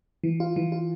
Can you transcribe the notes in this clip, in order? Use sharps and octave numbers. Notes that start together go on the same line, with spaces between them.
E3
F4
E3
F4